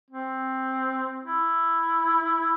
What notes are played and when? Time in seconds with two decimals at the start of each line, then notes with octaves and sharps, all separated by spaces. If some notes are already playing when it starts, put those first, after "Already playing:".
0.11 C4
1.25 E4